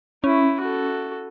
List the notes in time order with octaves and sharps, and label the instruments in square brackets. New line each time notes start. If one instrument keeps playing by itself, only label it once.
[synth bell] C#4 [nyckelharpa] E4
[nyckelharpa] F#4 A4